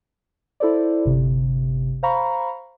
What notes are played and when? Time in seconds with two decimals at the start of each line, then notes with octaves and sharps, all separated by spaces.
0.60 E4 A4 C5 D5
1.06 G1 C3
2.03 C5 F5 A#5 B5 C#6